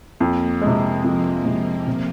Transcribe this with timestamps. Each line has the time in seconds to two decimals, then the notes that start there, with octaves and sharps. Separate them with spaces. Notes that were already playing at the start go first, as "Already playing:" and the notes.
0.20 F2 A#3
0.62 G#3
0.67 C3
1.04 F2 F3
1.45 C3 G#3
1.87 C3